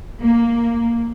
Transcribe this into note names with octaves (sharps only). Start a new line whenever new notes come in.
A#3